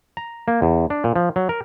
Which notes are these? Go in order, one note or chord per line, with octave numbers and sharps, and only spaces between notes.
A#5
A#3
E2
D4
A#2
F3
F#3
A#4